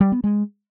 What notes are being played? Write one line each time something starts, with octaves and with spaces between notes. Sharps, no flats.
G3
B3
G#3